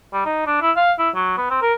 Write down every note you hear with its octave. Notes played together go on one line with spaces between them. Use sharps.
G3
D#4
D4
E4
F5
E4
F#3
B3
C4
A#4